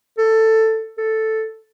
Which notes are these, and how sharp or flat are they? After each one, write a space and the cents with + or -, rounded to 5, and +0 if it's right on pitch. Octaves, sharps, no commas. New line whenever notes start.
A4 +10
A4 +0